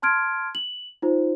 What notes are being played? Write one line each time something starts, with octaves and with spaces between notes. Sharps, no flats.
A5 C6 F6 G#6 D7
F#7
D#4 F4 C5